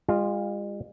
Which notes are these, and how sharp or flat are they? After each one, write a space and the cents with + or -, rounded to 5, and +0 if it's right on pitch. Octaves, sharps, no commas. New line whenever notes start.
G#3 -45 F4 +0